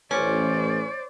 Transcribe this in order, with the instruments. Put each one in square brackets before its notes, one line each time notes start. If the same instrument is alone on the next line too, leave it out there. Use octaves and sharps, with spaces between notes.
[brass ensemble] A1 [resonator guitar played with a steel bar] C#4 [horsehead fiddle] C5 D5